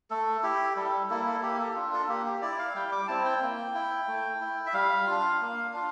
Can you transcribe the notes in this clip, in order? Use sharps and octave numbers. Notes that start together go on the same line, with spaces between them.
A3 A4
E4 G4
G3 A4
A#3 E4 A4
A4
A#3 G4
A4
D4 F4
A4
A#3 G4
G4
E4 D5
F5
G3 G5
D6
C4 E4 A5
G5
A#3
E4
A3
E4
E5
G3 F5
D4 F4
A#3
D4 F4